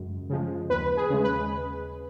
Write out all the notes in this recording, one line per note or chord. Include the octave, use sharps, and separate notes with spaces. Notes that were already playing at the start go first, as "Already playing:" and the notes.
Already playing: F#2 C#3 G#3
C#3 F3 G#3
D#2 B4
G#4
C#3 G#3
B4